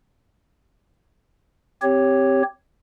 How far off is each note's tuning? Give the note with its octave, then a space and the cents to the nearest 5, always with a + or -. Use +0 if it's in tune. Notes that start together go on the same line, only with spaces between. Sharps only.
C4 +0 G4 +0 C#5 +0